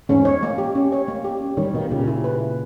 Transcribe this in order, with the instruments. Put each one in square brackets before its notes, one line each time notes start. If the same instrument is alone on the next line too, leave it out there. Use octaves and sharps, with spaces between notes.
[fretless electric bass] E2 G#2 [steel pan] C#4
[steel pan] C#5
A#3
G4
C#4
C#5
A#3
G4
C#4
[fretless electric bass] D#3 G3 [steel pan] C#5
[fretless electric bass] B2 D#3 [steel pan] A#3
[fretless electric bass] A#2 C#3 [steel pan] G4
[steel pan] E4
B4
A#3